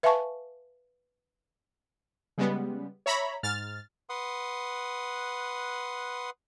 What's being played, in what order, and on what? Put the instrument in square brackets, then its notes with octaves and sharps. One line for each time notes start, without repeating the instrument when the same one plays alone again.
[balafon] B4 E5 F5 G#5 A5 C#6
[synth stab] C#3 G3 G#3 B3
C#5 E5 A#5 B5
G#2 F6 A6
[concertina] B4 F#5 C6 D#6